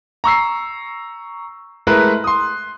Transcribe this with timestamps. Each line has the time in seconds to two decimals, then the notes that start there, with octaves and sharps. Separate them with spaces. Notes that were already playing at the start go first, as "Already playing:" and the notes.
0.24 A#5 C#6 E6 C7
1.87 G#3 A3 E4 A#4 B4 F#6
2.24 C6 D#6